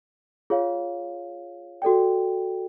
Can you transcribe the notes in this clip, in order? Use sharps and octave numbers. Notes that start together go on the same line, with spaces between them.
F4 G#4 C#5 F5
F#4 A4 D5 G5